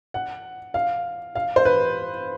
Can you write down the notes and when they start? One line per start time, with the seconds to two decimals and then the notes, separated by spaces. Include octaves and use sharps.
0.14 F#5
0.74 F5
1.35 F5
1.56 C5
1.65 B4